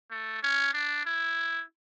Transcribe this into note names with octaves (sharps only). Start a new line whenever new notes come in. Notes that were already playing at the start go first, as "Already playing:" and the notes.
A3
C#4
D4
E4